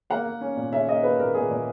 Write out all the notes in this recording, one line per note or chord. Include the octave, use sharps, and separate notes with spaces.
A#3 F#5
A#3
C#4
A#2
C#4 E5
A#3 D#5
A#3 B4
A#2 A#4
A#2 G#4
A#2